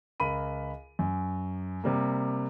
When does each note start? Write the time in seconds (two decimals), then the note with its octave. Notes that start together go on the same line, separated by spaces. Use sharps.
0.20 C#2 A#4 B5 D#7
0.99 F#2
1.84 C3 G3 A#3